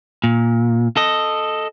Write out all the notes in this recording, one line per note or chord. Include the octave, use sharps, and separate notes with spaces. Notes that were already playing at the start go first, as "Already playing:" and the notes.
A#2
A4 D#5